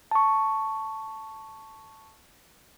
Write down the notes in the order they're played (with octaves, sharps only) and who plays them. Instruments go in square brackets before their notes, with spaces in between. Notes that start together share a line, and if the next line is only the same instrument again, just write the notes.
[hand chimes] A5 C#6